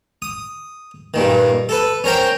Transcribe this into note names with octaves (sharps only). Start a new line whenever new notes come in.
D#6
G2 A#2 D#3
A4 B4
C#4 A#4 C5 G5